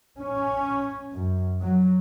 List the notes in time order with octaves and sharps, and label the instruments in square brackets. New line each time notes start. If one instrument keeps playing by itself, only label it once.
[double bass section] C#4
F#2
F#3